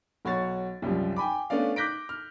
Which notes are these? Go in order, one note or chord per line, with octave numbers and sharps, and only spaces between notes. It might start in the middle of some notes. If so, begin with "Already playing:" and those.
B1 F#4 C#5 A6
C2 F#2 F3 G3
G5 G#5 B5 D6
A3 B3 C#4 D4 D5 F5
D6 F#6 G6 A#6 B6 D7
F6